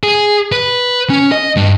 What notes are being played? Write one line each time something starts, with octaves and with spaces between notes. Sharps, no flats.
G#4
B4
C#4
D#5
G2